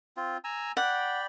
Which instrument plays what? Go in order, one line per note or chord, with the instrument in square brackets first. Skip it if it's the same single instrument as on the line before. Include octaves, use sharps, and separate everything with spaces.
[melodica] C4 F4
G#5 A#5 E6
[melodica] D5 G5 B5 [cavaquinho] F#5